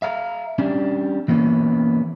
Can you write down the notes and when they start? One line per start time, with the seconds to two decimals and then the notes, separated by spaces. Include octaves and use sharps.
0.02 E5 F5 A#5
0.58 G3 C#4 D4
1.28 E3 A#3 B3 C#4